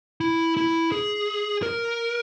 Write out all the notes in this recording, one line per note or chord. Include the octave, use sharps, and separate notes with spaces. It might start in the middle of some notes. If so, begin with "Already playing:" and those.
E4
E4
G#4
A#4